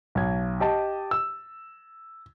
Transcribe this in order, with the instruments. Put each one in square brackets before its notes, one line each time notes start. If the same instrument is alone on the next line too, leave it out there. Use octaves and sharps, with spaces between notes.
[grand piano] B1 G#6
G4 D#5 A5
E6